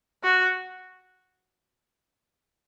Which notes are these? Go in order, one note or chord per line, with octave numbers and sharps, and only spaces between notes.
F#4